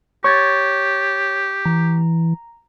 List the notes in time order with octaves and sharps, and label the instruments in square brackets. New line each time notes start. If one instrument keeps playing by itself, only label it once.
[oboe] G4 [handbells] C#5 G#6 A6 [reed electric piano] C#6
[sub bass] E3 [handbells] A#5